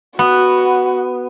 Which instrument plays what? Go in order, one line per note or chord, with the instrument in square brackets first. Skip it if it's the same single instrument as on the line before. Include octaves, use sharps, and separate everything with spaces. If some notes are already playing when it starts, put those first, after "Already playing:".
[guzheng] B3 [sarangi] F#4